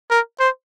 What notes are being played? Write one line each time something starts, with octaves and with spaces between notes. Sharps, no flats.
A#4
C5